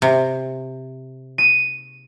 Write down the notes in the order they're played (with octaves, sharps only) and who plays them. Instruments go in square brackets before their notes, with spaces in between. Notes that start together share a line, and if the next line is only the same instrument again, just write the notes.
[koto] C3
[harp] D#7